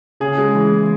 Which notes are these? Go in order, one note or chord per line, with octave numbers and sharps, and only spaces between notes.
C#3 G#4
G#3
E3
E3